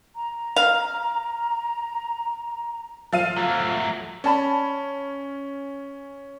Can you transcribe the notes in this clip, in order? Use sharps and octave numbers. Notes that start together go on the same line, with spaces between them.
A#5
F5
F3 F5 D#7
F#3 A3
C#4 D5 A5 B5